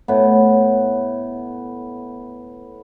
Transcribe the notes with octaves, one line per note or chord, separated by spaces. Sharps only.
A2 B3